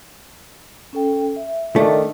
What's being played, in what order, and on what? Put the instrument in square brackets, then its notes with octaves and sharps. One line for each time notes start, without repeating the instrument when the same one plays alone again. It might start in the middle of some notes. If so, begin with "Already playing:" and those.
[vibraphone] C#4 A4 G5
E5
[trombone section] D#3 D4 D#4 [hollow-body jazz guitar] A3